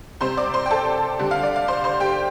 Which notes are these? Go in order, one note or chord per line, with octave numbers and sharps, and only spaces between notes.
C3 G3 C4 C5 C6
D5 D6
C5 C6
G5
A4 A5
D3 G3 D4
F5
D5
F5
C5 C6
C5 C6
G4 G5